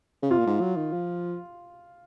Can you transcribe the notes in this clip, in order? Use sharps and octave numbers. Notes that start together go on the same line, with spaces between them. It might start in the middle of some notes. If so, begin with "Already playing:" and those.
C#3
C3 F4
A#2
G#2
F#3
D#3
F3